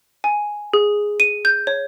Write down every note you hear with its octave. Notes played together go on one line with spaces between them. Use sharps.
G#5
G#4
D#7
G6
C#5